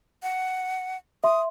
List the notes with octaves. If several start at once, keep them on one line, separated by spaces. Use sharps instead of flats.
F#5
E5 C6 D#6